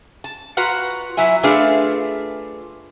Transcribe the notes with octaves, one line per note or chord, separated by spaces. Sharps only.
A5
F4 F#4 B4 F#5 A#5
F#3 E4 E5 G#5
A3 D4 F4 G#4 B4 E5